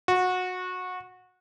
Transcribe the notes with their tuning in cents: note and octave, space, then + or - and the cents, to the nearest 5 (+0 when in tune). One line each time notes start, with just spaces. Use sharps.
F#4 -20